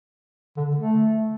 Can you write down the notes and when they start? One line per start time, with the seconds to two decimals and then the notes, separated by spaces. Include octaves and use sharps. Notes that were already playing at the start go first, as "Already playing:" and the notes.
0.57 D3
0.76 A3